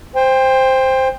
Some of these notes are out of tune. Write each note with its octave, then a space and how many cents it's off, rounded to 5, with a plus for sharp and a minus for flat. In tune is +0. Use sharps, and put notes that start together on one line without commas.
C5 +0 G5 +25